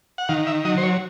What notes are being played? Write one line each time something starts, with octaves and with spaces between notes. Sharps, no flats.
F#5
D#3 F5
E5
F#3 D#5
C5
C#5